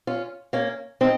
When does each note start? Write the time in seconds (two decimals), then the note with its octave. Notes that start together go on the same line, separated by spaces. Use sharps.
0.07 C#4 F4
0.53 A#3 C#4
1.01 C4 D#4